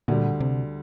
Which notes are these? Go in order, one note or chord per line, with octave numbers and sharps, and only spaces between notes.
D2 A#2 D3 G3
C3